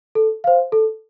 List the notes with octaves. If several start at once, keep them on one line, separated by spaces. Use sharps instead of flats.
A4
C5 F5
A4